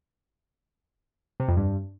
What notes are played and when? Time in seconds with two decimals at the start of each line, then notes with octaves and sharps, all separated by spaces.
1.40 C3
1.48 F2
1.57 G2